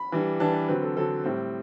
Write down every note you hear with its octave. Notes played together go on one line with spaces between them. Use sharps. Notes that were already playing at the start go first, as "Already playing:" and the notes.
Already playing: B5
E3 G3 D4
E3 G3 D4 A5
B4
D3 F#3 C4 B4
A4
D3 F#3 C4 A4
A2 G3 C4